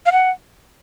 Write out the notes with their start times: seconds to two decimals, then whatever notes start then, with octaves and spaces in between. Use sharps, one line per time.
0.06 F5
0.12 F#5